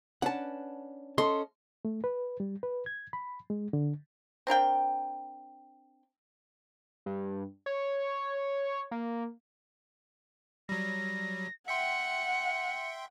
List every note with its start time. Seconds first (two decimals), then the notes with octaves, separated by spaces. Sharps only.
0.22 C#4 D4 B4 F#5 A5
1.18 C#4 A4 D#5 C6
1.85 A3
2.04 B4
2.40 G3
2.63 B4
2.86 G#6
3.13 B5
3.50 G#3
3.73 D3
4.47 C4 D4 A#4 G5
7.06 G2
7.66 C#5
8.91 A#3
10.69 F#3 G3 A#6
11.68 E5 F#5 G5 C6 C#7